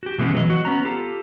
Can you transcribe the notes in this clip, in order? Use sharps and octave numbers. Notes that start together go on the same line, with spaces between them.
F#4 G4
B2 E3 G#3 A3 B3 C#4
E3 F#3 D#5
F#4
B3 C#4 A#5
F4 G4 A4